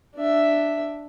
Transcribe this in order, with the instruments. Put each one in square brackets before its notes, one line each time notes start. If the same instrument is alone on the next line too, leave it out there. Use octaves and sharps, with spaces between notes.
[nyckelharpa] D4 E5